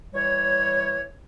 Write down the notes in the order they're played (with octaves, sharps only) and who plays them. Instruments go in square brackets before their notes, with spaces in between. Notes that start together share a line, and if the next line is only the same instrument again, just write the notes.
[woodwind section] E3 G3 C#5